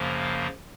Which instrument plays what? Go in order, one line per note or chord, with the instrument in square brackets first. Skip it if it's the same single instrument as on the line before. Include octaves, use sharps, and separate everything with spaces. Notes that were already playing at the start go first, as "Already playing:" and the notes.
Already playing: [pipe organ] F#2 C#3 F3 A#3